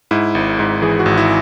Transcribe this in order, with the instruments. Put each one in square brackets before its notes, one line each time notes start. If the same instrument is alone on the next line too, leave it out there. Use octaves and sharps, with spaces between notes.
[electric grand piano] G#2 E4
G#1
G#2
E3 G#4
F#4
G#1
E4